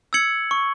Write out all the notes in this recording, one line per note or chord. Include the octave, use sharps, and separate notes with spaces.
E6 G#6 C#7 F#7
C#6